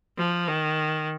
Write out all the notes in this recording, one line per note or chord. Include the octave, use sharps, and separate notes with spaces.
F3
D#3